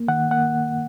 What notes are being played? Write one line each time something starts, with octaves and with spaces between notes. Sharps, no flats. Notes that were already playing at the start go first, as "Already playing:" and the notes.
Already playing: A#3
D#3 F#5
A#3 F#5